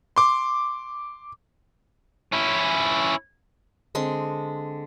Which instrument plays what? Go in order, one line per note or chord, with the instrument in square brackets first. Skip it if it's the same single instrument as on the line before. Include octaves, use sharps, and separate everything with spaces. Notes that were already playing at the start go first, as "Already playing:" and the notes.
[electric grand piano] C6 D6
[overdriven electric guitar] C#4 E4
[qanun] D3 G#3 C4 C6